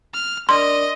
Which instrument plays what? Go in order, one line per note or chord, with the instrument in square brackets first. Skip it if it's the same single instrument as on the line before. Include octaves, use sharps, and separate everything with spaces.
[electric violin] F6
[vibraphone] D4 A#4 D5 [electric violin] D#5 [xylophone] C6